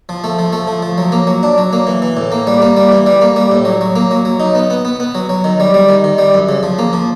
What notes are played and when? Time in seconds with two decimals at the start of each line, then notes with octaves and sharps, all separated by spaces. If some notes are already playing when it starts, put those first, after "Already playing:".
0.09 F3
0.24 A3
0.39 F3
0.53 A3
0.67 F3
0.82 F3
0.98 F#3
1.12 A#3
1.27 F#3
1.43 D4
1.58 F#3
1.73 A#3
1.87 E3
2.02 E3
2.17 A2
2.32 A#3
2.47 G3
2.62 A#3
2.77 G3
2.92 E3
3.06 G3
3.21 A#3
3.36 G3
3.52 A2
3.65 F#3
3.81 F#3
3.96 A#3
4.11 F#3
4.25 F#3
4.40 D#4
4.55 B3
4.70 B3
4.85 B3
5.00 B3
5.15 F#3
5.29 F#3
5.44 D#3
5.60 G3
5.74 G3
5.89 D#3
6.04 D#3
6.18 G3
6.34 F#2
6.49 C#3
6.63 F3
6.79 A#3
6.93 F3